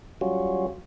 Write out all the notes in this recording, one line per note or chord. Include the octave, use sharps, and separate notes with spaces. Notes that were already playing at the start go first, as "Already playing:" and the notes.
F#3 G3 C#4 F4 F#4